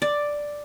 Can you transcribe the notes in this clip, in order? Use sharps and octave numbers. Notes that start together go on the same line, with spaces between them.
D5